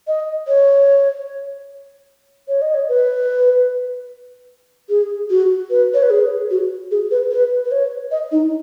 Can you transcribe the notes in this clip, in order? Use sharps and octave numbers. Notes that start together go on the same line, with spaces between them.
D#5
C#5
C#5
D#5
C#5
B4
G#4
F#4
B4
C#5
B4
G#4
F#4
G#4
B4
B4
B4
C#5
D#5
D#4